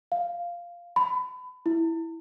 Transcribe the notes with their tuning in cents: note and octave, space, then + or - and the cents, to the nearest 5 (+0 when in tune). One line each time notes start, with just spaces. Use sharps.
F5 -5
B5 +30
E4 +0